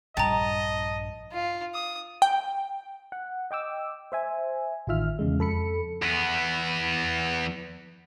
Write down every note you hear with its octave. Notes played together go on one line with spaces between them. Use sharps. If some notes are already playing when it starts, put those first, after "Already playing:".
A#1 G2 D#5 G5 A5 A#5
F4
D#6
G5
F#5
D#5 G5 D6 E6
C5 E5 G#5
A1 D#3 F4 E5 F6
E2 C#3 G#3
F2 A4 B5 C#7
E2 B3